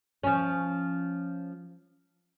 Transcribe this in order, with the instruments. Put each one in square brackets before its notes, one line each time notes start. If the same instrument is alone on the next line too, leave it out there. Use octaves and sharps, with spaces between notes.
[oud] F3 C#4